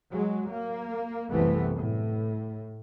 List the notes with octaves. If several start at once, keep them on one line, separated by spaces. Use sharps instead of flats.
F#3 G#3
A#3
F#1 C2 C3 E3 A3 B3
A2